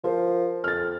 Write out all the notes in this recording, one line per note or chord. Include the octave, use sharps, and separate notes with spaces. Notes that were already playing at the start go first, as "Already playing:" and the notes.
F3 A#4 C5
F2 F6 A6